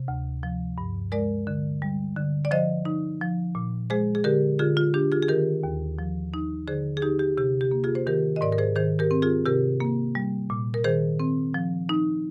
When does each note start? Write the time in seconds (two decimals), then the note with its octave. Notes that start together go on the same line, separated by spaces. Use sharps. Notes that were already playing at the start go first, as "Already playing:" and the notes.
Already playing: C3
0.08 D2
0.43 F3
0.78 G2
1.12 G#3 A#4 D5
1.47 D3
1.82 G3
2.16 D3
2.45 D5
2.51 F3 C5 D#5
2.85 D#4
3.21 F3
3.55 A#2
3.90 G#3 G#4 C5
4.15 G#4
4.24 D3 G4 A#4
4.59 D3 F4 G#4
4.77 F4
4.94 D4 G4
5.12 F4 G#4
5.22 G#4
5.28 D#3 G4 A#4
5.63 D#2
5.99 F3
6.34 D#4
6.68 D3 G#4 C5
6.97 G#4
7.02 D#4 G4
7.19 G4
7.37 C3 G4
7.61 G4
7.71 A#3
7.84 F4 G#4
7.95 C5
8.07 D#3 G4 A#4
8.36 D#5
8.41 G#2 A#4 D5
8.52 A#4
8.58 G#4 C5
8.76 D#3 G#4 C5
8.99 G4 A#4
9.11 C4
9.22 F4 G#4
9.46 C3 G4 A#4
9.80 A#3
10.15 G3
10.50 A#2
10.74 A#4
10.84 D#3 G#4 C5
11.20 C4
11.54 F3
11.89 D#4